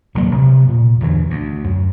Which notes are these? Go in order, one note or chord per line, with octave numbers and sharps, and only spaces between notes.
D#1 G2 F#3 A#3
C3
A#2
E2 D3 E3
D2
F#2